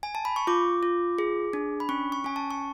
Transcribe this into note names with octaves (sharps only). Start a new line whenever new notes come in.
G#5
A5
B5
C#6
F4 D6
F4
G#4
D4
B5
C#4 C#6
C#6
C#4 G#5
A5
C#6